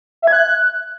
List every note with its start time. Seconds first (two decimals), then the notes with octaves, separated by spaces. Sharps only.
0.22 E5
0.27 G#6
0.33 F#6